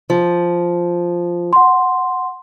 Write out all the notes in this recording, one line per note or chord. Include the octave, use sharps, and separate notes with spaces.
F3
F#5 C6